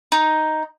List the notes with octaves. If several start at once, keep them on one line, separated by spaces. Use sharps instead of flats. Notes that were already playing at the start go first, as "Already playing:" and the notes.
D#4